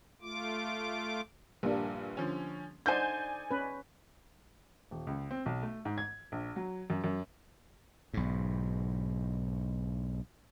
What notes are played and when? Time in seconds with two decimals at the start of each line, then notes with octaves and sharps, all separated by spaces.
0.22 A3 F4 D6
1.63 A#1 G2 G3 A#3 D4
2.17 D3 F3 C#4
2.86 D3 D#4 C5 D5 G#5 G6
3.51 C#4 B4
4.91 D#1
5.07 C#2
5.31 C4
5.46 B1
5.63 A3
5.85 G#2
5.98 G#6
6.32 A#1
6.56 F#3
6.90 F#2
7.04 F#2
8.14 B1 G#2